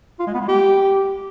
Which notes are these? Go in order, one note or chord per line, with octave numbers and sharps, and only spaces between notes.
F4
G#3
B3
G#3
G4